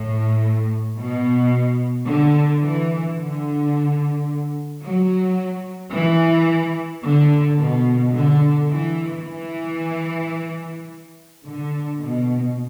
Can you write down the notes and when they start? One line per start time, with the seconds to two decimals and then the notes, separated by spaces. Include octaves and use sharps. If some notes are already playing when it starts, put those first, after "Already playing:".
Already playing: A2
0.97 B2
2.07 D3
2.62 E3
3.18 D3
4.83 F#3
5.93 E3
7.03 D3
7.59 B2
8.14 D3
8.69 E3
9.24 E3
11.45 D3
12.00 B2